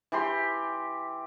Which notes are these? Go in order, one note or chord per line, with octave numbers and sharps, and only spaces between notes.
E3 G4 C6